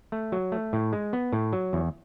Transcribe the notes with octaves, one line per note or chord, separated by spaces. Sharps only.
A3
F#3
A3
A2
G#3
B3
A2
F#3
E2